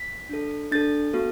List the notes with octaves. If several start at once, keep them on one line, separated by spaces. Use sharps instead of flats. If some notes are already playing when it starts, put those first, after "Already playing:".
Already playing: B6
D4 A4
D4 A4 A6
B3 F#4 A4